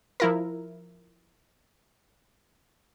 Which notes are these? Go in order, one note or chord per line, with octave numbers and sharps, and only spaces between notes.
F3 E4 A#4